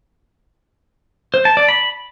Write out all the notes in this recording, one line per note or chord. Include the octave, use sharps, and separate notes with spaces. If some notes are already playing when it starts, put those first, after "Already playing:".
C5
A5
D5
B5